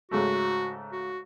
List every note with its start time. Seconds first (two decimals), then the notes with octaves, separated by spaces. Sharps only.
0.11 G#2 C#3 A3 F#4
0.92 F#4